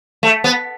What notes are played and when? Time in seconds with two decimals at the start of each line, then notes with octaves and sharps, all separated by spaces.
0.23 A3
0.44 B3